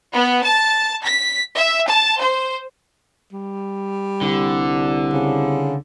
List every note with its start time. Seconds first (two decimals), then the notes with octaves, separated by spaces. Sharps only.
0.13 B3
0.43 A5
1.04 B6
1.56 E5
1.90 A5
2.20 C5
3.33 G3
4.21 C2 D3
5.13 C#3